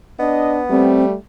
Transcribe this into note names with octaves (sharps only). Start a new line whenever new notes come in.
B3 D4 D#5
G3 A3 C4